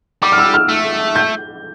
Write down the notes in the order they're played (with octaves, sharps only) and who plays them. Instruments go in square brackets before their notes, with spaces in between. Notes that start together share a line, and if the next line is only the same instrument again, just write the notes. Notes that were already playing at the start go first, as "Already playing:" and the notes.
[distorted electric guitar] G3 [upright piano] D6
[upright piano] F6
E6
F6
[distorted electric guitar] A3
[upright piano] G6